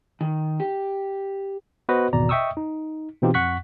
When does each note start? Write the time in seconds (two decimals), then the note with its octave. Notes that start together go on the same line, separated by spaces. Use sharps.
0.21 D#3
0.60 G4
1.89 B3 F#4 B4 C5 D#5
2.13 G#1 E2 B2 D5 A#5
2.29 D#5 E5 G5 C#6 D#6 E6
2.57 D#4
3.22 B2 E3 C4 D#4 F4 G4
3.34 F2 F#5 C#6 F#6 B6